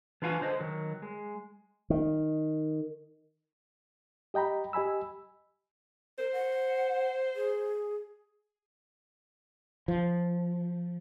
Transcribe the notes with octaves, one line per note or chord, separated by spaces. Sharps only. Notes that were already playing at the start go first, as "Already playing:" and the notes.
E3 D4 F4 F#4 F5 G#5
D3 C5 D#5
D#3 F#3
G#3
D#3
G4 D#5 G5 A#5 B5
G4 D#5 G#5 B5 E6
A#4 C5
F#5
G#4
F3